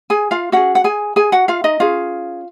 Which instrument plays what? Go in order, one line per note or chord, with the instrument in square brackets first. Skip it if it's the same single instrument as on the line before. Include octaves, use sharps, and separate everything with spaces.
[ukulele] G#4 G#5
F4 F5
C#4 F#4 G#4 F#5
F#5
G#4 G#5
G#4 G#5
F#4 F#5
F4 F5
D#4 D#5
C#4 F4 G#4 F5